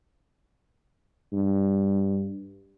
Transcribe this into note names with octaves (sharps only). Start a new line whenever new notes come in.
G2